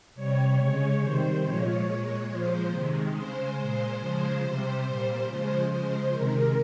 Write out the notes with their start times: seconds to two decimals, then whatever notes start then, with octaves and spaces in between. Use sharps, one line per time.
0.15 C3 G3 C#5
0.57 C#3 G#3
1.00 C3 D#3 G3 C5
1.42 A#2 F3 G#3 C#5
1.85 A#2 G#3
2.28 A#2 F3 G#3 C5
2.70 C3 D#3 G#3
3.12 C#3 G#3 C5
3.55 A#2 G#3 C5
3.98 C#3 F3 G#3
4.41 C3 G3
4.84 A#2 G3
5.25 C#3 F3 G#3 C5
5.69 C#3 F3 G#3 C5
6.11 C3 D#3 G#3 A#4